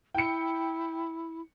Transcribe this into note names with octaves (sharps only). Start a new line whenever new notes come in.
E4 G5 C#7